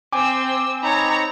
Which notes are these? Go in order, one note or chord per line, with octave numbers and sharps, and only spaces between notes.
C4 G5 G#5 D6 E6
C4 D#4 C#5 A#5 B5